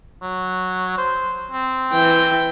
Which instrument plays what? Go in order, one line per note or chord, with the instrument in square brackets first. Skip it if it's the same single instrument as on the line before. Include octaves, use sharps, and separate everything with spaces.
[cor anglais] F#3
C5
C4
[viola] E3 G5